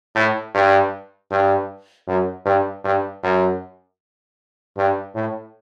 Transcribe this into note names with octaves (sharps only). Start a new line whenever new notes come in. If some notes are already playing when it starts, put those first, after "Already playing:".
A2
G2
G2
F#2
G2
G2
F#2
G2
A2